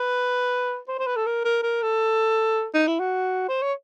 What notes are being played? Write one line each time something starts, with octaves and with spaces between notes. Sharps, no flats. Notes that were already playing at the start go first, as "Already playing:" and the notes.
Already playing: B4
C5
C5
B4
A4
A#4
A#4
A#4
A4
D#4
E4
F#4
C5
C#5